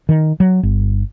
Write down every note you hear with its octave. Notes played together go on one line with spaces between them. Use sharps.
D#3
F#3
G1